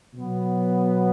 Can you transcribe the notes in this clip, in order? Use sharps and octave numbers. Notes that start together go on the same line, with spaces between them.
B2 F#3 B3